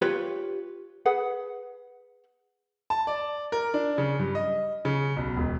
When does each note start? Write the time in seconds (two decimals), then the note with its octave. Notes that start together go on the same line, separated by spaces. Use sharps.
0.02 F4 G4 B4 C#5
1.06 G#4 B4 F#5
2.90 A5
3.07 D5
3.52 A#4
3.74 D4
3.98 C#3
4.19 G2
4.35 D#5
4.85 C#3
5.16 B1
5.37 E1